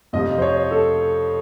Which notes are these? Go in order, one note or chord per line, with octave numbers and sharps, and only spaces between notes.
F2 C3 F3 D#5
C5
C#5
A4